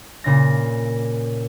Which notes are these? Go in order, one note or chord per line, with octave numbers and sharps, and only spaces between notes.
A#2 C#3 A#6